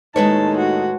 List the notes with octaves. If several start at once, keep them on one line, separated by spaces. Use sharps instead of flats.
D#2 A2 G#3 D#4 B4 C#5 A5
F#4